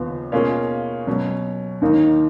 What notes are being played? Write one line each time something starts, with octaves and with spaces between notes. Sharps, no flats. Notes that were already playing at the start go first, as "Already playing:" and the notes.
Already playing: D#2 C#3 F3 B3
B2 A#3 C#4 F4 G#4
B2 F#3 C#4
D#2 D#3 A#3 D#4